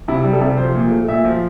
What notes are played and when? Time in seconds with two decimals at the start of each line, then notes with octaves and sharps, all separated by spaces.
0.08 C3 E4
0.24 G3
0.33 A4
0.41 C3
0.58 F3 C5
0.75 A#2
0.91 A3
1.08 A#2 E5
1.24 F3